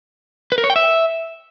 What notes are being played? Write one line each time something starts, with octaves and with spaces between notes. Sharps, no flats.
B4
A#4
C#5
G5
E5